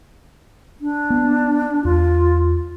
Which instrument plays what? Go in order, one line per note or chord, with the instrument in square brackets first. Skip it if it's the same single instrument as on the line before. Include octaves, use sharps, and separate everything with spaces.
[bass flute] D4
[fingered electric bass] B3
[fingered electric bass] E2 [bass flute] F4